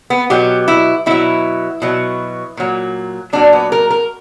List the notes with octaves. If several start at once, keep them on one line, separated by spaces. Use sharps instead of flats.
B3
B2 F#3 G4
E4
B2 F#3 E4
B2 F#3
A#2 F#3
A#2 F#3 D4
B3
A#4
A#4